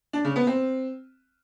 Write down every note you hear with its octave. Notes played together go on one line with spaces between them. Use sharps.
D4
C#3
B3
C4